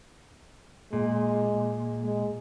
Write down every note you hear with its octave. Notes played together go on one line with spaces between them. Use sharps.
A#2 G#3
G#3